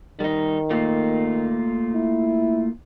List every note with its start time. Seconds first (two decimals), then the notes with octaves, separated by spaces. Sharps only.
0.20 D#3 G3 D#4
0.70 A3 A#3 F4
1.94 E4